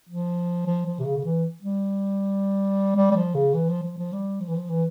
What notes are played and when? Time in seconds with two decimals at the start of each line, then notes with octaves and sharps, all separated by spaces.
0.09 F3
0.66 F3
0.86 F3
1.00 C3
1.05 C#3
1.18 C#3
1.24 E3
1.62 G3
2.96 G3
3.11 G3
3.16 F3
3.35 C#3
3.54 E3
3.69 F3
3.83 F3
3.98 F3
4.12 G3
4.40 F3
4.48 E3
4.56 F3
4.69 E3